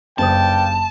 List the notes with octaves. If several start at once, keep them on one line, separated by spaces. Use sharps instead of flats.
F#1 G2 C5 G5 A5 D#6